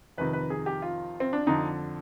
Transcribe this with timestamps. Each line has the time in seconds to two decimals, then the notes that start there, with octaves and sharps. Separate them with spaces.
0.18 F2 C3 D#3 B4
0.33 B4
0.50 G#4
0.66 G4
0.82 F4
1.20 C4
1.33 D4
1.46 F2 D3 D#4